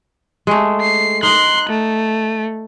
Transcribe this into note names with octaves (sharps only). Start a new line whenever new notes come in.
G#3 A3
C7
D#4 A#4 C6 F#6
A3